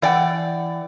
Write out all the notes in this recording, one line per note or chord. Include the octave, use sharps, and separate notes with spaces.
E3 D5 F#5 G5